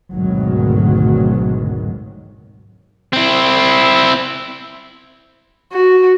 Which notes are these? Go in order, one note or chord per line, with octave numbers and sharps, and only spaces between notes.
G#1 D2 G#2 B2 D#3 F#3
C4 E4
F#4